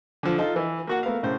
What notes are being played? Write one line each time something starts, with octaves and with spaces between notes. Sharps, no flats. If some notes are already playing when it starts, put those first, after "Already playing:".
D3 F3
D#4 F4 A4
E3
A#3 F#4 F#5
A3 B3 A#4 F5
A2 C#3 C5